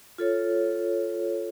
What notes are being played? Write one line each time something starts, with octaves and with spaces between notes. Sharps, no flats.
F4 A4 C#5